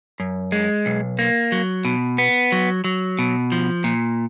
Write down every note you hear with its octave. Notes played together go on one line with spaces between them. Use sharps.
F#2
G#3
B1
A#3
F#3
B2
B3
F#3
F#3
B2
F3
A#2